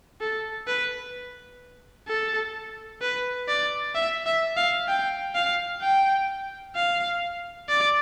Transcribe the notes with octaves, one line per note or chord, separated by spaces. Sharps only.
A4
B4
A4
B4
D5
E5
E5
F5
G5
F5
G5
F5
D5